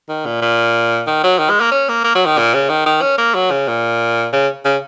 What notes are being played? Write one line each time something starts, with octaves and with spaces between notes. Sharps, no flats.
D#3
A#2
A#2
D#3
F#3
D#3
G#3
A#3
C#4
A#3
A#3
F#3
D#3
A#2
C#3
D#3
D#3
C#4
A#3
F#3
C#3
A#2
C#3
C#3